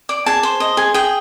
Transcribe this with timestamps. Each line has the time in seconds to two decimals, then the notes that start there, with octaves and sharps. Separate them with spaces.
0.09 D5
0.26 G#4 A5
0.43 C5
0.60 D#5
0.77 G#4
0.94 G#4 G5